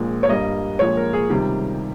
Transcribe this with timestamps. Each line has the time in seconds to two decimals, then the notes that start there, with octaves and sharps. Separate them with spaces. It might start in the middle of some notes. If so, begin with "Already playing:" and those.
Already playing: A#1 A#2 G#3
0.23 C#5
0.29 G2 G3 A#3 D#5
0.79 A#1 A#2 F3 G#3 C#5
0.97 A#4
1.13 G#4
1.30 C#2 C3 D#3 G3 G4